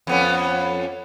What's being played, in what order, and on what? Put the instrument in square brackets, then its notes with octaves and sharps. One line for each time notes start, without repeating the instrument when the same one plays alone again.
[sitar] F2 B3 C#4